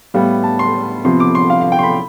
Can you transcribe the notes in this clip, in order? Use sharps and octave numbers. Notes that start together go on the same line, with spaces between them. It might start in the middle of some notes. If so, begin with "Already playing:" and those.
A2 G3 B3 F5
A5
C6
C3 F3 B3 C6
D6
C6
F5
F5
G5
C6
B5